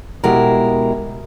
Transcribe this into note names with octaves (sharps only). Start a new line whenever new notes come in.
B2 G#3 E4 G4 A#4